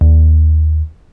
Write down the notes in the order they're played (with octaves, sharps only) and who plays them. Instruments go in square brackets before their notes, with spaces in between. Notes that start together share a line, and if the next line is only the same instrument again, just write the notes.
[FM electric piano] D#2